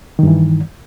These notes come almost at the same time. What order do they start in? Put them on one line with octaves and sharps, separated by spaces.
D#3 G2 E3